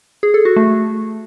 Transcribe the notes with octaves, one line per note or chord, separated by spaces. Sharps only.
G#4
A4
F#4
A3